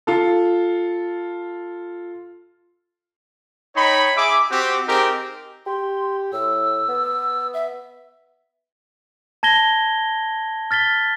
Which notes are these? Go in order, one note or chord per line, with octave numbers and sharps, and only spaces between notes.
F4 A4
D#4 C#5 G5 B5
G#4 E5 D6
C4 F#4 G4
C4 D#4 G4 G#4 A#4
G4 C6
A2 E6
B3
E5
A5 G#6 A#6 G7
F6 A6 B6 G7